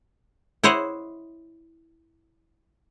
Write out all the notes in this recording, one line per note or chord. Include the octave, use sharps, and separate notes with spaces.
E4 C5 C#5 D#5 F#5